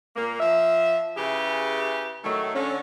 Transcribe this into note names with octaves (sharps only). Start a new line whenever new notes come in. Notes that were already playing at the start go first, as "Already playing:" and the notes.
A#2 A#3
F3 E5
C#3 E4 G4 G#4 B4
A2 D#3 F#3 A3
D3 C#4